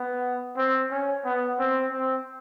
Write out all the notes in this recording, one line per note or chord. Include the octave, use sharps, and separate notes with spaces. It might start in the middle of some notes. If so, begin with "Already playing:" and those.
Already playing: B3
C4
C#4
B3
C4
C4